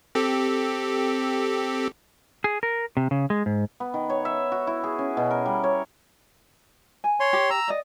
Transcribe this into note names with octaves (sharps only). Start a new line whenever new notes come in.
C4 G4 A4
G#4
A#4
C3
C#3
G#3
G#2
B3
D#3
C#5
E5
F#4
E4
G#4
C#4
B2
A#4
G3
C#5
G#5
C#5 C6
G4
A#5 E6
D5 D#5